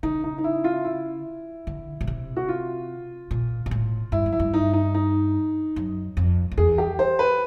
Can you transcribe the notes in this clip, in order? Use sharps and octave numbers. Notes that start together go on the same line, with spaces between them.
C#3 D#4
D#4
D#4
E4
F4
E4
D3
B2
C3
F#4
F4
A#2
G#2
A2
G2 E4
F#2
E4
G2
D#4
D#4
D#4
F#2
F2
F2
E2 G#4
G4
C5
B4